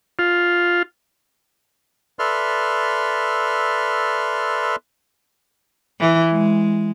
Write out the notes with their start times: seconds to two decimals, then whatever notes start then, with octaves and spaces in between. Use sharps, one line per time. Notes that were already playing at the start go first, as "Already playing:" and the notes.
0.19 F4
2.19 A4 B4 D5 E5 C6 F6
6.00 E3
6.31 G#3